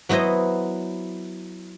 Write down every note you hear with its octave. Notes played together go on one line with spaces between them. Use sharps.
F#3 B3 E4 C5 D#5